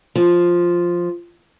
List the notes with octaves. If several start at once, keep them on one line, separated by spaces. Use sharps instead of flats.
F3